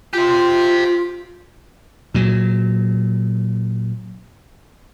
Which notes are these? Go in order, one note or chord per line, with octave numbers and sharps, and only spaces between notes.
F4 G4 C5
A#2 F#3